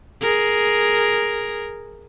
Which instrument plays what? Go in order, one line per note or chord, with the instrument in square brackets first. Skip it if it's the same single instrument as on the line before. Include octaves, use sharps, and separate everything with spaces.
[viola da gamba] G#4 A#4